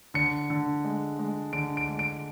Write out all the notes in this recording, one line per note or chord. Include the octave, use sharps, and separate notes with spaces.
D3 C#7
D3
G#3
G#3
D3 D7
D7
G#3
D7